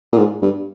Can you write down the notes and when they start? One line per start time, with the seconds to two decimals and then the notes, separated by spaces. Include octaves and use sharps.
0.13 A#2
0.18 G#2
0.42 G2